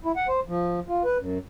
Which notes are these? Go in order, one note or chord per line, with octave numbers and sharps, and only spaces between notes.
E4
F#5
C5
F3
F4
B4
F#2